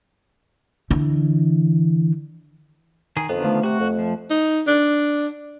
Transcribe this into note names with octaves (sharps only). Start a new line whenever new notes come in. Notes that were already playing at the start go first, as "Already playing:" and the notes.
D3 E3
D#3 G#4
F2 D3 D#3 B3
F3 A3
C3 F#4 F#5
F2
F3
D#4
D4